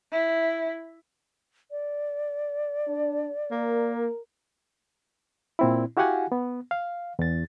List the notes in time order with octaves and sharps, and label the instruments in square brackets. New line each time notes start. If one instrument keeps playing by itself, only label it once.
[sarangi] E4
[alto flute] D5
[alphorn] D4
[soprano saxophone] A#3 [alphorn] A#4
[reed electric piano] A#2 C4 E4
E4 F#4 G4 F5 F#5 G#5
B3
F5
E2 A6